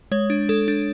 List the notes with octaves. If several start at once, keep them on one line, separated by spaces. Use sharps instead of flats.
G#3 C#5
D4
G#3 A4
D4